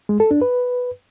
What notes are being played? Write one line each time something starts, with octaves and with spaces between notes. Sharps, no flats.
G#3
A4
D4
B4